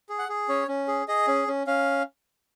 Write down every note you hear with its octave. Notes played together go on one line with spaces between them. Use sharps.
G#4
F#5
G#4
C#4 C#5
C#4
G#4
G#4 D#5
C#4
C#4
C#4 F5